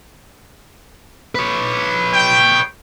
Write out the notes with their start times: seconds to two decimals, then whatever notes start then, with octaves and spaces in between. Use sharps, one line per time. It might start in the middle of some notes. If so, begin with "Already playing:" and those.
1.35 B4 C#5
2.14 G5